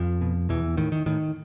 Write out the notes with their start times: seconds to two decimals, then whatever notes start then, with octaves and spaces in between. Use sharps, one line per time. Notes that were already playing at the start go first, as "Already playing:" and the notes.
Already playing: F2 F3
0.21 B2
0.49 E2 B2 E3
0.77 A2 D#3
0.92 D#3
1.06 A2 D#3